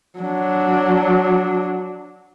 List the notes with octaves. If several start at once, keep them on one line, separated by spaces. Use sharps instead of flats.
F#3 D4